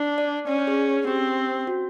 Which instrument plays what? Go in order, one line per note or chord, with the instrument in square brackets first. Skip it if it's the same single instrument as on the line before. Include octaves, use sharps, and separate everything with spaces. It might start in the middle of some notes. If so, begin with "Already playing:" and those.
Already playing: [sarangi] D4
[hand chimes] D5
[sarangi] C#4 [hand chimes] D5
[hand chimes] C#5
G#4
[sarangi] C4 [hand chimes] G4
[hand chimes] F#4